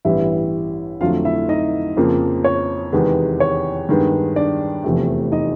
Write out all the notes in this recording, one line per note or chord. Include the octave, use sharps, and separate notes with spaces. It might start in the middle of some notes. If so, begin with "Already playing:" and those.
A1 G2 E3 G3 B3 E4 E5
F2 D3 F#3 A3 F4 F5
E4 E5
D#4 D#5
F2 C#3 F3 A#3
C#5
E2 C3 D#3 G#3 B3
C#5
G2 D#3 G#3 B3
D4 D5
F1 E2 C3 F3 A3
D#4 D#5